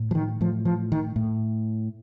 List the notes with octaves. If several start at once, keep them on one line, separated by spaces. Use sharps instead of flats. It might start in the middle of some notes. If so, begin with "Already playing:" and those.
Already playing: A2
F3
D#3
A2 F3
F3
D#3
A2